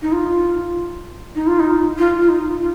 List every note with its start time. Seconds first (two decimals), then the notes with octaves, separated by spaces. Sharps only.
0.02 D#4
0.12 F4
1.35 D#4
1.47 F4
1.59 D#4
1.98 F4
2.21 F4
2.29 D#4
2.60 F4